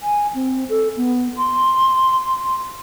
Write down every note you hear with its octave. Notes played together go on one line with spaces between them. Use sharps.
G#5
C4
A4
B3
C6